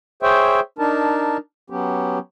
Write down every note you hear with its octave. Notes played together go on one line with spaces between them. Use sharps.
G#4 C5 C#5 E5 G5
D4 D#4 A#4 A5
F#3 B3 C#4 G4